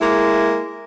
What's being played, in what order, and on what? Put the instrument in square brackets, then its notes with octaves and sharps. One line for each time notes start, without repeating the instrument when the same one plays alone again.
[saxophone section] G#3 A#3 E4